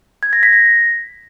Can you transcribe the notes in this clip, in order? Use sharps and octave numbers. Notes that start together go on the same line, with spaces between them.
G#6
A#6
B6
A#6